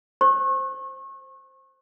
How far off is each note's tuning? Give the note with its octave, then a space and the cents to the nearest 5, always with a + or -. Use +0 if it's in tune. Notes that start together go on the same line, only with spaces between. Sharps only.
C5 +0 C#6 -35